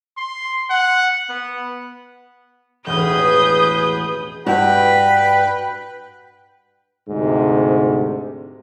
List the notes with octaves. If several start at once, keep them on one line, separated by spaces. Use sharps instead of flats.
C6
F#5
B3
E1 A1 G#4 B4 D#6 F6 G6
G2 F#4 B4 G5 B5
D2 G#2 C3